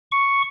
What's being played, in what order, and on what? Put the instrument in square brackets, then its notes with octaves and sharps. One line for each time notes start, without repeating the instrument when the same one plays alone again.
[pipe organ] C#6